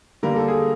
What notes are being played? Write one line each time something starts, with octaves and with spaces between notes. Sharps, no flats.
D3 G3 A#3 A#4
A4
G#4